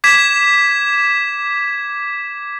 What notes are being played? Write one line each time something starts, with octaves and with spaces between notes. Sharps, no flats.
D6 G#6 B6 E7